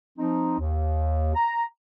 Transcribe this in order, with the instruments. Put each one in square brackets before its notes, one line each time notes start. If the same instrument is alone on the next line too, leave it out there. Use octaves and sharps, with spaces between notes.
[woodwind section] F3 C4 D#4
D#2
A#5